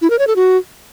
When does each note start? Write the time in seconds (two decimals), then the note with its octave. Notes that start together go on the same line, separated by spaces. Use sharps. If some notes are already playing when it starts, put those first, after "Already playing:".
0.02 E4
0.10 A#4
0.19 C#5
0.27 A4
0.36 F#4